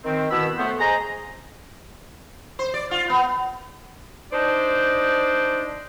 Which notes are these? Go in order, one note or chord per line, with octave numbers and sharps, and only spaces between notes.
D#3 C4
B2 D#3 B3 E4 B5 E6
A3 B3 C5
G#4 C5 D#5 A#5
C5
D5
F4
B3
D4 D#4 C5 D5